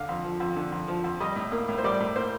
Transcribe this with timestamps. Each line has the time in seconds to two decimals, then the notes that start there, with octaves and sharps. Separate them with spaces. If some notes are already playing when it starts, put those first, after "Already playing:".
Already playing: D3 F5
0.09 F2
0.25 F3
0.40 F2
0.56 D3
0.72 F2
0.88 F3
1.04 F2
1.20 G3 D#5
1.36 A2
1.52 A#3
1.68 A2
1.78 C5
1.84 G3 D5
2.00 A2
2.16 A#3 C5